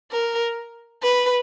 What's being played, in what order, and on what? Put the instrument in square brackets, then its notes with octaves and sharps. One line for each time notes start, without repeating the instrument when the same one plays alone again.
[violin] A#4
B4